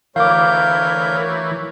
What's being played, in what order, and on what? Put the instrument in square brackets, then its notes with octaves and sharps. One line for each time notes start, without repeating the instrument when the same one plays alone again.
[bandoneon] D2 A#4 G6 [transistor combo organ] E3 [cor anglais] C#5 [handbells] F5 D6